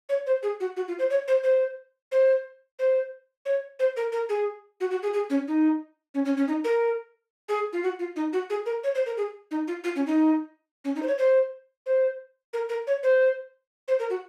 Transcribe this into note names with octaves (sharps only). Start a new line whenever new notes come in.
C#5
C5
G#4
F#4
F#4
F4
C5
C#5
C5
C5
C5
C5
C#5
C5
A#4
A#4
G#4
F#4
F#4
G#4
G#4
C#4
D#4
C#4
C#4
C#4
D#4
A#4
G#4
F4
F#4
F4
D#4
F#4
G#4
A#4
C#5
C5
A#4
G#4
D#4
F4
F4
C#4
D#4
C#4
D#4
C5
C#5
C5
C5
A#4
A#4
C#5
C5
C5
A#4
F#4